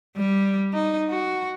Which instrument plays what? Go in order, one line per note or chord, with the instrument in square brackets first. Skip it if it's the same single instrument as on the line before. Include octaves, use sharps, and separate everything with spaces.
[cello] G3
D#4
F#4